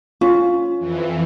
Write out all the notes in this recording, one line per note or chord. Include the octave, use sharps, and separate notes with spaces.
C#4 F4
F2 E3